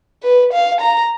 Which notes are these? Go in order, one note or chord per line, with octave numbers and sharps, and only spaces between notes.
B4
F5
A#5